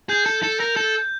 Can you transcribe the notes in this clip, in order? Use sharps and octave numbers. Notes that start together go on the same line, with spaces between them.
G#4 G6
A4
A4
A#4
A4